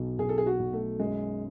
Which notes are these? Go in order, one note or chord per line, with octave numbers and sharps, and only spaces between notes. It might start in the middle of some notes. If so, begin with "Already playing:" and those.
Already playing: B1 B2
B1 G#4
A4
G#4
F#4
B1
A3
F#2 G#3